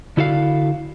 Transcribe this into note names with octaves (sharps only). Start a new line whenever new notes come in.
D3 E4 F#4 A4 D#5 F5